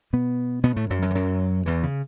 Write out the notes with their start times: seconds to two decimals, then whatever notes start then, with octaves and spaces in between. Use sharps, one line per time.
0.13 B2 B3
0.64 B2 B3
0.76 A2 A3
0.90 F#2 F#3
1.02 F#2 F#3
1.10 E3
1.15 F#2 F#3
1.66 E2 E3
1.83 C#3